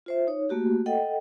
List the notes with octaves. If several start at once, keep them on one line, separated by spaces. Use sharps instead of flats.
F4 C5 E5
D#4 C#5
A3 A#3 F#4 G4
A4 D#5 F#5 G5